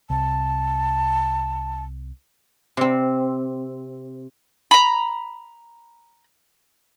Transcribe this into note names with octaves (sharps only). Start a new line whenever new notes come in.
C2 A5
C3 C4
A#5 B5